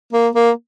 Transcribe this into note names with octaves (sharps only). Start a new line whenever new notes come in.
A#3
A#3